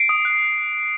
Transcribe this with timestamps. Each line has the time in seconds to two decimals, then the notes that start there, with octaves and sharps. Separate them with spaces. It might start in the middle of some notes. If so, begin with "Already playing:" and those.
Already playing: C7 D7
0.09 D#6
0.25 F#6